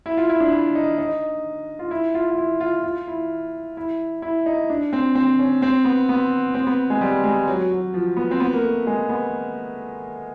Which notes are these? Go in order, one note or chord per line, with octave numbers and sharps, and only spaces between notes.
E4
F4
E4
D4
E4
D#4
D#4
F4
E4
F4
F4
E4
F4
F4
E4
E4
E4
D#4
D4
C4
C4
C#4
C4
B3
B3
C4
B3
G#3
G3
G#3
F#3
F#3
F3
B3
C4
B3
A#3
A3
G#3
B3